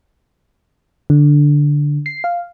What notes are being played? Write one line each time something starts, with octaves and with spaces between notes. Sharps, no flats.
D3
C7
F5